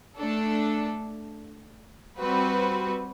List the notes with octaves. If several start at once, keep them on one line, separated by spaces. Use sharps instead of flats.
A3 D4 A4
G3 C4 F#4 B4